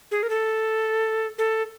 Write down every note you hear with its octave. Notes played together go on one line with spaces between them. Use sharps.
G#4
A#4
A4
A4